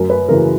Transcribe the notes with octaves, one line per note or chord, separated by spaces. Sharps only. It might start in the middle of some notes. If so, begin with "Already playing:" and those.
Already playing: F#2 A#4
B4
C#3 E3 A#4